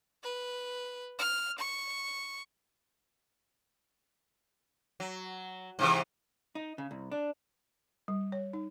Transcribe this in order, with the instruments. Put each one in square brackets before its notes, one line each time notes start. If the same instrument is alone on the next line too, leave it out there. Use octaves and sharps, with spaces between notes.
[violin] B4
F6
C#6
[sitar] F#3
G#2 C3 E3
[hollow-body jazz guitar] D#4
C#3
C2
D4
[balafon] G3
C#5
D#4